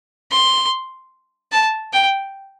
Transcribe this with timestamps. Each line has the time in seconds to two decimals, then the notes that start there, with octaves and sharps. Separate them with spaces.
0.31 C6
1.52 A5
1.93 G5